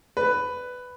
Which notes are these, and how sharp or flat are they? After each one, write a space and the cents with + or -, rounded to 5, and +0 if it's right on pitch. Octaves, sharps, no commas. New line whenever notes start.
B4 +10 D5 +0